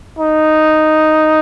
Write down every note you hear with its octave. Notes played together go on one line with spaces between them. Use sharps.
D#4